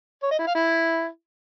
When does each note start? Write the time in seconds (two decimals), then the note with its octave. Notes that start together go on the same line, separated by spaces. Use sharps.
0.23 C#5
0.31 D#5
0.39 E4
0.47 F5
0.55 E4